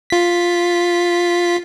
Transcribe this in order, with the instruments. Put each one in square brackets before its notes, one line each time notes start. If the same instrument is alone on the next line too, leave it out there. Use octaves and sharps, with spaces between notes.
[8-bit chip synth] F4 B6